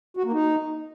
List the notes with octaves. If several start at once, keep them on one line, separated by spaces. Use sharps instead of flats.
F#4
A#3
D#4